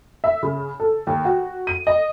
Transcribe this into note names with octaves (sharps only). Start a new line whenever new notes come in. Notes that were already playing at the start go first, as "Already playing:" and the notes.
E5
C#3
A4
D#2
F#4
D#7
D#5